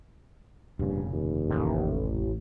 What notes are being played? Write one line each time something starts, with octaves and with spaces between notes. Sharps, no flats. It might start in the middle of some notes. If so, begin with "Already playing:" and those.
F1 G2 A#2 C#3
D#2
A1